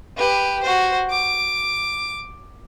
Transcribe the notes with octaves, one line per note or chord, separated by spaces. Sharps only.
G4 B4
F#4 C5
D6